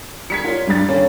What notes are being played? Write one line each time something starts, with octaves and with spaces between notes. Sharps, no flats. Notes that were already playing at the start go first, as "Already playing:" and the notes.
G3 G#6 B6 C#7
F4 A#4 C#5 C6
G2 G3 A6
A#3 C#4 A4